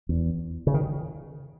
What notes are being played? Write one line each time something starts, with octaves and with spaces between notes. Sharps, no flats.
E2
C#3
D#3